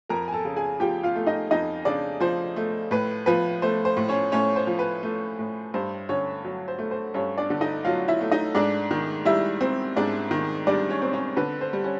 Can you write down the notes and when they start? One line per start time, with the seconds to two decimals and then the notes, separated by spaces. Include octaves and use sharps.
0.09 F2 A#4 A#5
0.28 G#5
0.33 A4 A5
0.45 C#3
0.56 G#4 G#5
0.80 F3 G4 G5
1.03 F4 F5
1.15 A3
1.27 D#4 D#5
1.51 F2 D#4 D#5
1.85 C#3 D4 D5
2.20 F3 C5
2.56 A3
2.91 A2 B4
3.26 F3 B4
3.62 A3 C5
3.85 C5
3.97 A2
4.09 C#4 C#5
4.32 A2 C#4 C#5
4.56 C5
4.67 F3
4.79 B4
5.03 A3
5.39 A2
5.74 G2 C5
6.09 D3 C#4 C#5
6.44 F#3
6.68 C5
6.79 A3
6.91 C5
7.14 G2 C#4 C#5
7.38 D4 D5
7.50 D3
7.61 D#4 D#5
7.85 F#3 F4 F5
8.08 E4 E5
8.21 A3
8.32 D#4 D#5
8.55 G#2 D4 D5
8.91 D#3
9.25 G3 E4 E5
9.61 C4
9.96 G#2 D4 D5
10.31 D#3
10.67 G3 D4 D5
10.90 C#4 C#5
11.02 C4
11.13 C#4 C#5
11.37 D3 B4
11.61 C5
11.73 G3
11.84 C#4